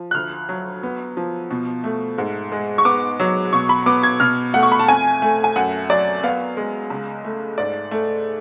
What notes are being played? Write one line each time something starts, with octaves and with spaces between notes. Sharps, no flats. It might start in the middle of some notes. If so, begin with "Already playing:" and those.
Already playing: F3
F#6
D2 F6
F#3
B3
F3
B2
A3
G#2
G#3
C#6
B3 D6
F#3
B2 C#6
B5
B3 D6
G#6
B2 F6
A3 F#5
C#6
B5
A5
F2 G#5
A3
G#5
F#2 F#5
F#3 D5
B3 F5
G#3
C#2
A3
G#2 D5
A3